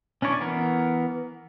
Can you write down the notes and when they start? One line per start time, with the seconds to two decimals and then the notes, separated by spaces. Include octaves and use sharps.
0.22 C#4 D4 E4 C#5 D5
0.40 E3 B3 A#4